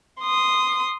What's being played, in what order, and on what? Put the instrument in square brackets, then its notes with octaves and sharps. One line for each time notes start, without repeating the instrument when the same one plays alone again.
[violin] C6 D#6